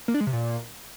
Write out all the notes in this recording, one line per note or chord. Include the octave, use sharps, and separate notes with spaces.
A#3
D4
G#3
C3
A#2